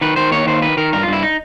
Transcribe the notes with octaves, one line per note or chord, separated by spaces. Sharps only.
D#3 B4
D#3 C5
D#2 C#5
D#3 C5
D#3 B4
D#3 A#4
G2 A#4
F4
G2
E4
D#4